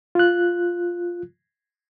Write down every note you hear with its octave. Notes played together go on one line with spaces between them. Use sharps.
F4 F#6